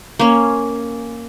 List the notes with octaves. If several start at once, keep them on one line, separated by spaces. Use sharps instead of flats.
A#3 C#4